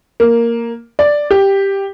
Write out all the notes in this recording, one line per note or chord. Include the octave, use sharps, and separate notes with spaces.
A#3
D5
G4